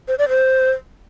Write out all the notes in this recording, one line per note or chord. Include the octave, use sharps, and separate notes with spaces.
C5
D5
C5